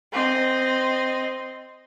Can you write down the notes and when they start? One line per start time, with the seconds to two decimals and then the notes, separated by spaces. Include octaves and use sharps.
0.12 C4 D#5